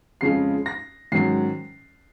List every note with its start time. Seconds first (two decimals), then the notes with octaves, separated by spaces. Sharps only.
0.21 F2 C#3 G#3 C#4 F4 C7
0.66 A#6
1.12 G#2 D#3 F#3 C#4 C7